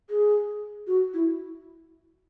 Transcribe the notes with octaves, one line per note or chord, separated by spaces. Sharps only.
G#4
F#4
E4